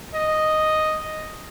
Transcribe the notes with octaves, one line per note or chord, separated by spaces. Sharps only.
D#5